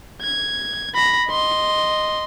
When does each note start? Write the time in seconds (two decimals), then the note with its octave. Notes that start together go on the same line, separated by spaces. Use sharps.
0.22 G#6
0.95 B5 A#6
1.29 D#5 C6